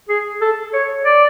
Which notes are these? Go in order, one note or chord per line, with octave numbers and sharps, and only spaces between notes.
G#4
A4
C#5
D5